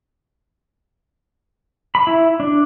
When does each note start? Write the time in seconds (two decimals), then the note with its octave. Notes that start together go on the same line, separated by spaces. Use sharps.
1.95 B5
2.07 E4
2.40 D4